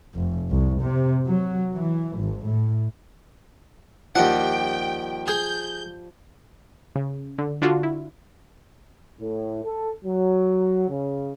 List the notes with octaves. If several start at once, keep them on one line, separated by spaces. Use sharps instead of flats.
F1
C2
C3
F#3
E3
G#1
A2
D#2 F3 G3 F#5 G5
G#4 G6
C#3
D3
D3 D4 F4 F#4
E4
A2
A4
F#3
C#3